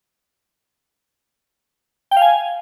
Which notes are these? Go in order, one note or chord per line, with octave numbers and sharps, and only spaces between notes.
G5
F5
G#5